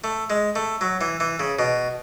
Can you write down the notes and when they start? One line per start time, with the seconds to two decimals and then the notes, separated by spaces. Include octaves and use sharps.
0.04 A3
0.30 G#3
0.56 A3
0.81 F#3
1.01 E3
1.20 E3
1.39 C#3
1.59 B2